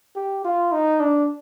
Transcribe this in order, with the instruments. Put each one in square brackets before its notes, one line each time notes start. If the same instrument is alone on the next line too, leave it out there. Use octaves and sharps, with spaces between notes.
[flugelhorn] G4
F4
D#4
D4